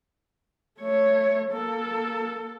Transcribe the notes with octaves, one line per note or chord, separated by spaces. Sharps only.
A3 C#5
A#3 A4